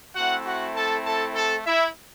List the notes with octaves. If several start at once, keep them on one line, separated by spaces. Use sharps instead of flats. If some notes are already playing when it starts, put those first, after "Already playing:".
A3 C4 E4 F#4 F#5
F#4 F#5
A4 A5
A4 A5
A4 A5
E4 E5